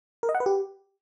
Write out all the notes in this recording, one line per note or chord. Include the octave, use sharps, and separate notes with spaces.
A#4
D#5
F#5
B4
G4